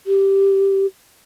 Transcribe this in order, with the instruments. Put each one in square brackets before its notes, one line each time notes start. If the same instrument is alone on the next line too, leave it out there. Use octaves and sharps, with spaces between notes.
[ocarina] G4